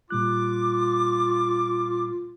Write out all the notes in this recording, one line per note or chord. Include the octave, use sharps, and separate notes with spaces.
A#2 G3 F4 D6 F#6